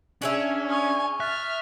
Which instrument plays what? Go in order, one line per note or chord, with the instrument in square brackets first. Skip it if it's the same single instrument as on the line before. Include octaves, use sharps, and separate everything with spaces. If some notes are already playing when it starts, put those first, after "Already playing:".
[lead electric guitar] C#4 [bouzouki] D4 G#4 E5
[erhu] G#5 [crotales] C#6 D#6 F6
[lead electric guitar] E5 [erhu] F6 [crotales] F#6 A6